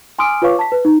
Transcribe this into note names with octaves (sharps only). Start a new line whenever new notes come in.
G#5 C6 D6 D#6 F6 D7
F4 B4 C#5 F5 C#6 D6
A5 B6
B4
D#4